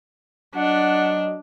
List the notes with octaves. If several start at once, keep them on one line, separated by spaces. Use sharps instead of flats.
F#3 D4 D#5 F#5